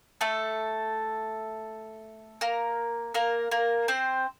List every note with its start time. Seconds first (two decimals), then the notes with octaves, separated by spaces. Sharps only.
0.21 A3 A4
2.41 A#3 A#4
3.14 A#3 A#4
3.51 A#3 A#4
3.88 C4 C5